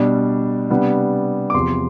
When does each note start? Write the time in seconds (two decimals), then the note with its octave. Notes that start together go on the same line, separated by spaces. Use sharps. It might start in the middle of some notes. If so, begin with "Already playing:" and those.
Already playing: B2 G3 D4
0.70 C3 G3 B3 D4
1.50 D6
1.54 E2 C3 F3 C6